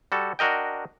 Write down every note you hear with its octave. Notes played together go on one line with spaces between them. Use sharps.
G3 F#4 A4
D4 F#4 A#4 D#5 G5